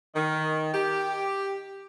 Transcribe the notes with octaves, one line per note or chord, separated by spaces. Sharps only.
D#3
G4